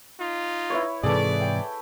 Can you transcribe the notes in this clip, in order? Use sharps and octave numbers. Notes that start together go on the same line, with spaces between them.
D#4 F4
E4 B4 C#5
G#2 C3 E3 G#4 A4 B4 D5
G5